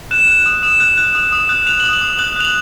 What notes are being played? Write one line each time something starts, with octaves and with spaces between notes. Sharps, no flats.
F#6 E7
F#6
D#6
D#6 E7
F#6
F#6
D#6
D#6
F#6
F#6 F7
F#7
D#6
F#7
D#6
F#6 F#7
F#6 F7
F#7